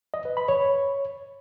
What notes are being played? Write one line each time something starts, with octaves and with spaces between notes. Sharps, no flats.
D#5
B4
B5
C#5